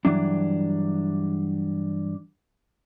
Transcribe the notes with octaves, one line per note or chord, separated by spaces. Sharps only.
G2 E3 F#3 D4